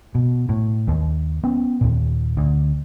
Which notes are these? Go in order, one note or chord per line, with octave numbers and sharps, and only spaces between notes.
B2
A2
D#2
B3 C#4
D#2 A#2
D2